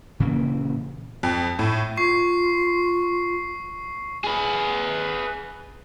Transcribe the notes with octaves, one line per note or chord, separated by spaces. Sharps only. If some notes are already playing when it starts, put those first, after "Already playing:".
A#2 C#3 E3 A#3
F2
A2
F4 C#6 C7
G#4 B4